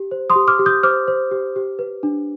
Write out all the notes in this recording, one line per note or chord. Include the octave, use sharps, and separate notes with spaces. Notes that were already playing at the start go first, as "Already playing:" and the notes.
Already playing: G4
C5
C6 D#6
G4
D6 F6
G4
D#6 G6
C5 D6 F6
C5
G4
G4
B4
D4